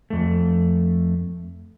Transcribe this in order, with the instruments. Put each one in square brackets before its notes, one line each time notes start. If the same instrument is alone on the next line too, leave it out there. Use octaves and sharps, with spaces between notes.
[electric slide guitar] F2 A3